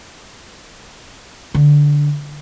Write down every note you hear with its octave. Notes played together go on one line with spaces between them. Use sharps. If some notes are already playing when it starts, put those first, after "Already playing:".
D3